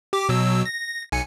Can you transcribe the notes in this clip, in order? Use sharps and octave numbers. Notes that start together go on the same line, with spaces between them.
G4 D6
B2 F#3 E6
A#6
B1 G#5 C#7